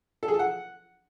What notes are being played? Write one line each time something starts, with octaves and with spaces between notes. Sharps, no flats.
A4
G#4
A4
F#5